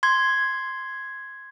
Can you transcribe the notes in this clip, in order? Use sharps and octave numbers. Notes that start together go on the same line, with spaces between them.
C6 G#6